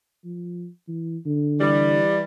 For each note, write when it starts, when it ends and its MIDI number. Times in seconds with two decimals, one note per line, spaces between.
0.25 0.68 53
0.88 1.17 52
1.26 2.01 50
1.60 2.23 52
1.60 2.23 55